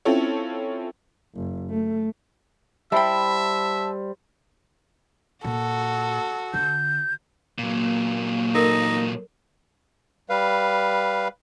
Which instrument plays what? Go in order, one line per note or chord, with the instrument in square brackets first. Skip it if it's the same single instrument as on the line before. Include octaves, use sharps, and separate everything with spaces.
[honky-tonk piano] C4 C#4 E4 F4 A4 C#5
[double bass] F#1
A3
[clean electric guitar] G3 C5 G5 [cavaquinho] E4 B5 [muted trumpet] E5 [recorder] A5
[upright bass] A#2 [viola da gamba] F#4 [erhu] A4
[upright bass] D3 [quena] G6
[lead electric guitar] A#2 F#3 [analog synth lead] A#3
[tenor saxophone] D#4 [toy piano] A4 A#4
[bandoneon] G3 B4 F5